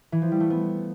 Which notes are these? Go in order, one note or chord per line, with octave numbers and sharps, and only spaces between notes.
E3
F3
G3
A3
B3